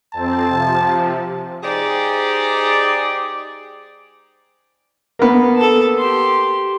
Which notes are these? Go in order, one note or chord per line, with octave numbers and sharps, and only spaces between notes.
F2 C4 A5
C3 F3
G#3 D#4 G4 G#4 C5 D5
A#3 B3
A4 A5
G4 C6